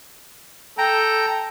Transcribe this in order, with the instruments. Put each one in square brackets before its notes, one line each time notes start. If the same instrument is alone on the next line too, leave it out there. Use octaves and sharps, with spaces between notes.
[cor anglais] A4 [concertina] G5 A#5